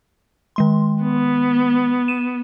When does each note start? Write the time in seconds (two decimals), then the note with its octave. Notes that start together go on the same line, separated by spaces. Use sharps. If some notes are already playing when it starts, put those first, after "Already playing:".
0.56 D#3 G#3 C6
1.03 B3
2.08 D#7 E7